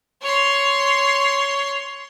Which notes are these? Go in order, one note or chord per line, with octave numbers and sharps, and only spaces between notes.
C#5 C6